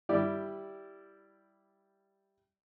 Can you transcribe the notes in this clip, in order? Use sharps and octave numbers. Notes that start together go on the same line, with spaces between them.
G3 E4 G4 D5